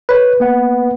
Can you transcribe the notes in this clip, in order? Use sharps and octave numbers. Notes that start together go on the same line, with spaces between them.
B4 C#5 F#6
A#3 B3 F#5